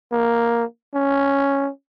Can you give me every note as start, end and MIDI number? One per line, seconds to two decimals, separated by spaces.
0.12 0.64 58
0.95 1.69 61